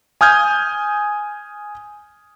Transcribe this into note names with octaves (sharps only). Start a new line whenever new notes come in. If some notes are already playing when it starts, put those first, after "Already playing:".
G#5 D#6 F6 G6 G#6